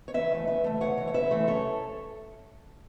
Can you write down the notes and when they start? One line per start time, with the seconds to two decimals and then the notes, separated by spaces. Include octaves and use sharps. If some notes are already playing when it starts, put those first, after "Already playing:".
0.08 C#5
0.14 E2 B4 E5
0.32 E3 A3
0.47 E2 B4 E5
0.64 E3 A3
0.81 E2 C#5 F#5
0.98 E3 A3
1.07 C#5
1.14 E2 B4 E5
1.31 E3 A3
1.47 F#2 A4 C#5